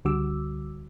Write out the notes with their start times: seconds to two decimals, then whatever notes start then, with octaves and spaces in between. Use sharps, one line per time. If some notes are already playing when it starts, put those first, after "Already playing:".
0.05 C#2 D3 G3 F#4 D6 E6